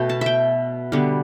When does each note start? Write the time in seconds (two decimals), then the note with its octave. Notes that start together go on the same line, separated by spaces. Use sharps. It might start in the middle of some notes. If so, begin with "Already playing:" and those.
Already playing: B2 A3 G5
0.09 A5
0.21 E5 G5
0.92 D3 G3 B3